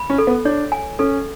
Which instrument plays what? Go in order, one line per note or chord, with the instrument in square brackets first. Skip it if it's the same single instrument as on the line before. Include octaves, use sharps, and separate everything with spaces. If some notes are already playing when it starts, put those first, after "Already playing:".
Already playing: [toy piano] B5
[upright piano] C#4
[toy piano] A4
[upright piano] B3
[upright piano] D4 [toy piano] C#5
[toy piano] G#5
[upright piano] C#4 [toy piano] A4